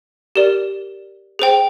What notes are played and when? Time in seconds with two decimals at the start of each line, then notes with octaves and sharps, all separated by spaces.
0.36 G4 A#4 D5
1.39 G#4 C5 G5